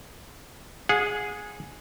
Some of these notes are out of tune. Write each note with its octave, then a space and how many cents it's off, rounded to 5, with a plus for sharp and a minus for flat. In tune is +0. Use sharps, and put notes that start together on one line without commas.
G#4 +0 F#5 -35